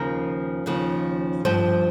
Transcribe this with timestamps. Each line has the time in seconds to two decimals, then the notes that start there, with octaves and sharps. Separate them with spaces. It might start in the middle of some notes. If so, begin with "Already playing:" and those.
Already playing: D#2 C#3 F3 A#4
0.66 D#2 C#3 F3
1.45 G2 F3 C5